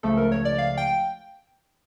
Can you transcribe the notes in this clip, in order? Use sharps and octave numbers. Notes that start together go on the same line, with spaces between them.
C#2 C#3 F3 A3 A4
A#4
C#5
D5
F5
G5